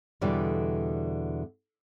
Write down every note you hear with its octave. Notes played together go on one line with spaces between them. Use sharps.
E2 B2 D3 G3 D5